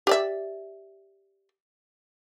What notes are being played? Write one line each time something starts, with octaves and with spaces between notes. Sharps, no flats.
G4 D5 E5